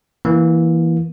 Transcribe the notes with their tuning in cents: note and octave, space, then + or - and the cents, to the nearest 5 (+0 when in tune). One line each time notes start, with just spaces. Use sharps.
E3 +0 A#3 +15